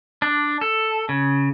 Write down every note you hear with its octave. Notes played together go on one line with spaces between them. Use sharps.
D4
A4
C#3